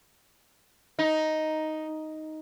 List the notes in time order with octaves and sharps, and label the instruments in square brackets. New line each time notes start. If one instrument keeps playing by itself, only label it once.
[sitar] D#4